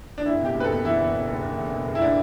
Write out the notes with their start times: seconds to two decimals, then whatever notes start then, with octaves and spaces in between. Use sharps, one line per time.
0.18 D4
0.26 F#1 E4
0.40 B2 G4
0.55 F#1
0.60 B4
0.64 A4
0.70 B2
0.84 E2 E4
0.99 E2
1.13 B2
1.28 F#1
1.43 F#1
1.58 E2
1.73 B2
1.88 F#1
1.95 E4
2.02 D4